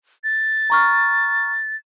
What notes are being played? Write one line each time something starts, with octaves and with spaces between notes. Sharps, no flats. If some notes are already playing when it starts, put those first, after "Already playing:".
A6
A#5 C#6 F6